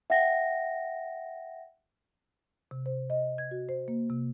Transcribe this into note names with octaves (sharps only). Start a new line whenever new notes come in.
E5 F#5 G5 A#6
C3
C5
D#5
G#6
F#4
C5
A#3
C3